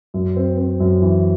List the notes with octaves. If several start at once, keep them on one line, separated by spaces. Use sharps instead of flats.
F#2
C4
C4
F#2
E3